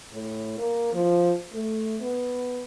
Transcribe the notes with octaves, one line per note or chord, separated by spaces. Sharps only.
A2
A#3
F3
A3
B3